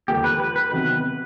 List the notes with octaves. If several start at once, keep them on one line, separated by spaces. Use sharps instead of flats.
D#2 D3 F3 A#3 G4
B4
B4
B4
C3 D#3 F#3 B3 D#4 B4